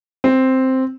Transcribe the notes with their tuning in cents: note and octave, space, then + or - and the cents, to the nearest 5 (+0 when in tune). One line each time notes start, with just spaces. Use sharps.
C4 +0